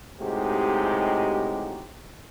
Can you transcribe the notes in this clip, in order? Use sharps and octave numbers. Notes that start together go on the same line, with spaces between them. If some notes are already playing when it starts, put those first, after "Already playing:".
A2 C3 G#3 D#4 F#4 G4